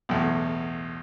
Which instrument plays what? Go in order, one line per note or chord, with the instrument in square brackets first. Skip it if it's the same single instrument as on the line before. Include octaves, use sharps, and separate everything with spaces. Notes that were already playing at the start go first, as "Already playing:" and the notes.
[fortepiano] B1 E2 A2